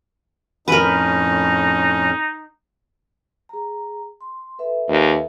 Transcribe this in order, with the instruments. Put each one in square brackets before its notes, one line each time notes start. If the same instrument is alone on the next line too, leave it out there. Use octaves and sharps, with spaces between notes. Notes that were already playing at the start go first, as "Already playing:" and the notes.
[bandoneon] F2 A2 C#4 [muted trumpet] D#4 [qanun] A#4 B4
[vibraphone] G#4 A#5
C6
A4 B4 E5
[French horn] D#2